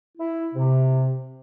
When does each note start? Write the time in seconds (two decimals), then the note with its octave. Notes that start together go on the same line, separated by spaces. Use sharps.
0.18 E4
0.54 C3